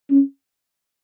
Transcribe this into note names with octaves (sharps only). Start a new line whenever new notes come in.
C#4